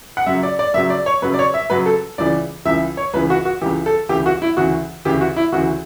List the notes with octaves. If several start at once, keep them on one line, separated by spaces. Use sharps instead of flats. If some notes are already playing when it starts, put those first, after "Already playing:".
F#5
F#2 C#3 F#3 E5
D5
D5
F#2 C#3 F#3 E5
D5
C#5
F#2 C#3 F#3 B4
D5
C#5
E5
F#2 C#3 F#3 B4
A4
C#2 C#3 E3 D5
C#2 C#3 E3 E5
C#5
C#2 C#3 E3 B4
F#4
F#4
C#2 C#3 E3 G4
A4
D2 C#3 E3 G4
F#4
E4
D2 C#3 E3 F#4
D2 C#3 E3 G4
F#4
E4
D2 C#3 E3 F#4